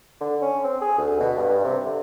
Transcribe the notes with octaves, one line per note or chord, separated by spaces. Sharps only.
D3
C#4
C4
G#4
D2
B2
G2
G2
C3
D3